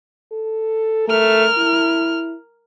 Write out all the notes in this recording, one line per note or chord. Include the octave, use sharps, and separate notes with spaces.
A4
A3 A#4 F6
E4